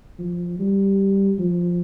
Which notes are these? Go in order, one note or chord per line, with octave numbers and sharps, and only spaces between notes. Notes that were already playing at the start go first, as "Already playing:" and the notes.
F3
G3
F3